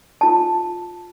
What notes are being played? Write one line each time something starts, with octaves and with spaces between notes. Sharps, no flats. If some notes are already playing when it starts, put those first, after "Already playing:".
F4 A5